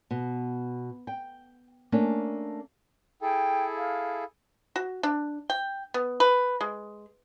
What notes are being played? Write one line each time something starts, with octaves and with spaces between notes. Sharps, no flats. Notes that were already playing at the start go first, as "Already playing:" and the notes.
B2
G5
A3 A#3 C#4 D4
E4 G#4 A4 G5
F5
F#4
D4
G5
B3
B4
G#3